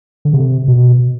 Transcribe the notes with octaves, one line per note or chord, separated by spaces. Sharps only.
D3
C3
B2